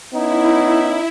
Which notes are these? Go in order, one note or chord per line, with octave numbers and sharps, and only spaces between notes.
B3 C#4 D#4 E4